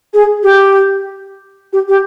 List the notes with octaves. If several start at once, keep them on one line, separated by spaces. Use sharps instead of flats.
G#4
G4
G4
G4